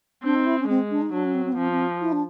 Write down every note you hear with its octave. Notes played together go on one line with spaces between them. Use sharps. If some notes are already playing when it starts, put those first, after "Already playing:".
C4 D4
D#4
E4
C#4
G#3 C4
D4
D#4
F#3 D4
C#4
C4
C4
B3
F3 C4
C4
E4
D4